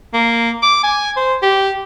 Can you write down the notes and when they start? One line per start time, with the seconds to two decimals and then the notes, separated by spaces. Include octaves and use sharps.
0.14 A#3
0.63 D6
0.83 G#5
1.16 C5
1.42 G4